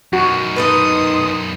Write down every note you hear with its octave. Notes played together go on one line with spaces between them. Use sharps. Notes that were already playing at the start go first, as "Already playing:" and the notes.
F#2 D#3 F#4
D#4 A4 B4 C6 D#6